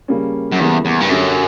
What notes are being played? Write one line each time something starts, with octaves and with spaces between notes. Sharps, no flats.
C#3 G3 A#3 C#4
F#2
E2 C#3 G3 A#3 E4
E2
G2
F#2 D3 F#3 C#4 G4